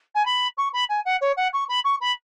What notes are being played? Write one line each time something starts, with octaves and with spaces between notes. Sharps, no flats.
G#5
B5
C#6
B5
G#5
F#5
C#5
F#5
C#6
B5
C#6
B5